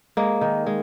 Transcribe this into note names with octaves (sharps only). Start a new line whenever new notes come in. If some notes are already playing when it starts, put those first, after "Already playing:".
G#3 A#3
D#3
G#3